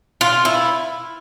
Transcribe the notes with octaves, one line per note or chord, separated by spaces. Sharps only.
F4
E4